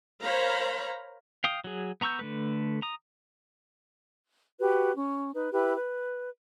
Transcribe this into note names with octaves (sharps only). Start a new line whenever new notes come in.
A#4 C5 C#5 F5 A#5 B5
F5 G5 D#6
F#3 G#4
B3 A#5 C#6 E6 G6
D3 A3 B4
A#5 D#6
F#4 G4 B4
C#4
D#4 B4
E4 G4 B4
B4